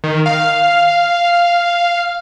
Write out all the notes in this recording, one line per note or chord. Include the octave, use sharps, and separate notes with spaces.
D#3
F5